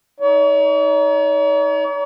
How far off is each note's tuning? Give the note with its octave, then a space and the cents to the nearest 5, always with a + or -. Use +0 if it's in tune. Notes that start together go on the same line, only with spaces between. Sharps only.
D#4 +20 C#5 +45